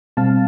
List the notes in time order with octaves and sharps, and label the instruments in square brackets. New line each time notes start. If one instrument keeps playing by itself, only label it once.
[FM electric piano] B2 G3 C4 F5 A5